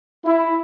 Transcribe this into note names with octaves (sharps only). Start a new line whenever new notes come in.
E4